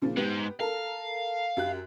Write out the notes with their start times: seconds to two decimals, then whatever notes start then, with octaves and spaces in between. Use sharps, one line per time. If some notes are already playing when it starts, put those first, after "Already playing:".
0.02 A#2 C#3 F3
0.17 G#2 B3 G4
0.60 A4 A#4 F5
1.57 F#2 G4 F#6